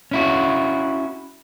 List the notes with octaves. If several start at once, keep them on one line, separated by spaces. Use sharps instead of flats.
C#4 E4 F#4